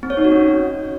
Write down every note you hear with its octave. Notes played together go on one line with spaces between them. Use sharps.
C4
C#5
D#4
F#4
C#4